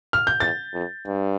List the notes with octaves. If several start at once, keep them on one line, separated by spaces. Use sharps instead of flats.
F6
G6
E2 A6
F2
G2